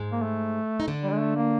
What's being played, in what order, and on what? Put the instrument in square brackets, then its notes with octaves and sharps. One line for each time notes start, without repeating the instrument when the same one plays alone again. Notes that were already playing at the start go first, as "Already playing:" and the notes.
Already playing: [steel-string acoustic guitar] G#2 G#3
[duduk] A#3
A3
[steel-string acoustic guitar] D#4
D3 D4
[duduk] G3
G#3
A3
A#3